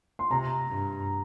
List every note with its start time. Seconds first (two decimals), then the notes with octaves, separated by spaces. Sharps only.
0.19 C6
0.31 C3 A#5
0.68 G2